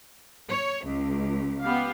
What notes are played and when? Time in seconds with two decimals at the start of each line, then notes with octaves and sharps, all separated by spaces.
0.49 C#5
0.86 C#2
1.62 B3 G4 F5